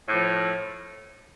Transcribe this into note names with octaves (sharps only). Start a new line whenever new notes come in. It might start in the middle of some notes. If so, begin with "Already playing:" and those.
A2
F3